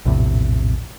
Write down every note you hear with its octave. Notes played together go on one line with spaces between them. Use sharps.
A#1 E2 A2 C3